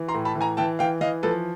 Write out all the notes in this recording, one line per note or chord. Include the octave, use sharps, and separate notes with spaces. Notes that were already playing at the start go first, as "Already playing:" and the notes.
Already playing: E3
A#5 C6
A2
A5 B5
E3
G#5 A#5
E3 G5 A5
E3 F5 G5
E3 D#5 F5
F3 A4 B4